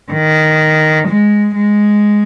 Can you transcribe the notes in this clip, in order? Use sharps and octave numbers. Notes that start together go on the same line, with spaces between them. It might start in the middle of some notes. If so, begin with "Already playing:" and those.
D#3
G#3
G#3